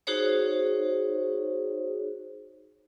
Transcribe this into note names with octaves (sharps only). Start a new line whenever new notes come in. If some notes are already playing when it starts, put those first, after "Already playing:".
D#4 F#4 G#4 C5 C#5